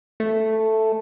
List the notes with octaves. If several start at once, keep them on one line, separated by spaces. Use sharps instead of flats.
A3